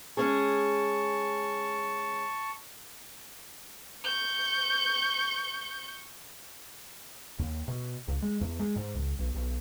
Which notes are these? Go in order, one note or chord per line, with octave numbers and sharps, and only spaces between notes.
G#3 C#4 G#4 A5 C#6
C#6 G6
D#2
B2
C#2
G#3
E2
G#3
G#2
C#2
B1
B1